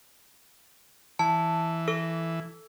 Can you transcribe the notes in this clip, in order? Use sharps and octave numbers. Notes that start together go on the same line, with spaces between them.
E3 A5
A4 E6